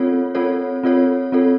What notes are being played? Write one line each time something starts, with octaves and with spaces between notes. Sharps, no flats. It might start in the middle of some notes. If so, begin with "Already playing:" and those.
Already playing: C4 F4 A4 C#5
C4 F4 A4 C#5
C4 F4 A4 C#5
C4 F4 A4 C#5